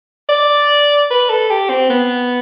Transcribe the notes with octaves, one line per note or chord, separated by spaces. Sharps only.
D5
B4
A4
G4
C4
B3